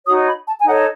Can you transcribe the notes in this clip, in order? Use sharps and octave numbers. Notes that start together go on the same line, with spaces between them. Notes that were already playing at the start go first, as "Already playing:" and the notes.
D#4 F#4 C#5 D#6
B5
A5
G#5
D#4 A4 C#5 F#5